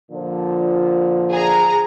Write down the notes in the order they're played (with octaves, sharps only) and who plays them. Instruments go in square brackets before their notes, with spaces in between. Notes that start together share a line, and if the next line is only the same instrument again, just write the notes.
[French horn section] A#2 D3 F3
[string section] G#4 A#5